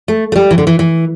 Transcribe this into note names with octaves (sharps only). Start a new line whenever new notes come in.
A3
A3
G3
E3
D3
E3
E3